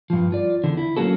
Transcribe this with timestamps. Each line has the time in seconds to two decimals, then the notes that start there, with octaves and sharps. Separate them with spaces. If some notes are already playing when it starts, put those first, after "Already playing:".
0.10 G2 F3
0.32 F4 D5
0.64 E2 D3
0.77 E4
0.97 F#3 A#3 C#4 F#4 A4